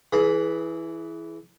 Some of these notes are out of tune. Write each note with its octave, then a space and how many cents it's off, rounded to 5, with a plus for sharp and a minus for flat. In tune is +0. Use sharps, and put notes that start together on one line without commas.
E3 +0 G#4 +25 B5 +0